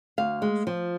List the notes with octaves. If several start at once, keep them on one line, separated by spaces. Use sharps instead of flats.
D2 F5
G#3
F3